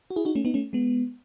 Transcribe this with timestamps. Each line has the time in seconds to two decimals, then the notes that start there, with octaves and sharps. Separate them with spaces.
0.10 F#4
0.16 E4 G#4
0.25 D#4 F#4
0.35 A3 C#4
0.45 B3 D#4
0.54 A3 C#4
0.73 G#3 B3